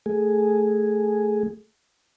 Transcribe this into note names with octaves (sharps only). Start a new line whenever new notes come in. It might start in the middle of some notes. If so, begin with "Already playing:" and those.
A3 G#4